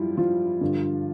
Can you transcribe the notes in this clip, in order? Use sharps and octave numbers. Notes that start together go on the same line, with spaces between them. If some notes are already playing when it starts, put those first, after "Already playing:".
Already playing: F#2 F3 G3 E4 F4
F3 F4
G2 D3